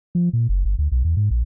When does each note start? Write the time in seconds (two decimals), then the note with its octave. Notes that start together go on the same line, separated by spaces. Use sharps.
0.15 F3
0.33 A#2
0.49 F#1
0.65 G1
0.78 D2
0.92 B1
1.05 E2
1.17 G#2
1.31 A#1